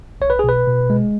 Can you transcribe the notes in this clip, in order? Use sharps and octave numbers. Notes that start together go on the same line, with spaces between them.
B1 C#5
B4
G#4
B2 B4
B2
G#3